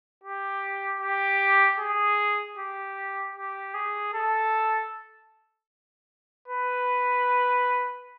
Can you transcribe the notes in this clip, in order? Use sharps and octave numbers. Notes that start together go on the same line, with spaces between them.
G4
G4
G#4
G4
G4
G#4
A4
B4